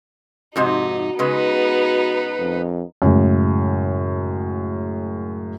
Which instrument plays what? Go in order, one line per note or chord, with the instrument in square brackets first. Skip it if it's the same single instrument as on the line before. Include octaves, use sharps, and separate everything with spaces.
[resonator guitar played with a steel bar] F2 G#2 C3 [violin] D#4 [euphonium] F#4
[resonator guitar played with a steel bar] C#3 G#3 [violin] B3 D#4 [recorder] B4
[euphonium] F2
[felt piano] F#2 A2 C#3 G#3